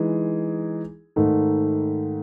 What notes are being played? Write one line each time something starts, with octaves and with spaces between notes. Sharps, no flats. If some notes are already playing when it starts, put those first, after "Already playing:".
Already playing: E3 G#3 D#4 G#4
G#2 D#3 A3